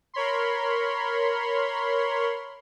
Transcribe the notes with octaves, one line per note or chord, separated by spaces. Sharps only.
A#4 C#5 B5 C6